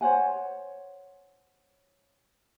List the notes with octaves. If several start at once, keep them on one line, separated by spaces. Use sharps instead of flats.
C5 C#5 F#5 G#5